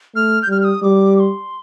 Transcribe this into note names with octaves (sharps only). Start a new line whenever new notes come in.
A3 F6
G6
G3 F6
F6
D#6
G3 D6
D6
C6